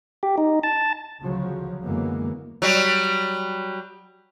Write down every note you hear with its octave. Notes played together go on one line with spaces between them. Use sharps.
G4
D#4
A5
D2 C#3 F3 F#3
F#2 D3 E3 G#3 A#3 B3
F#3 G3